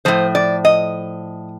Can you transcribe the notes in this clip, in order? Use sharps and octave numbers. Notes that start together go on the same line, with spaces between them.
A2 F3 C5
D5
D#5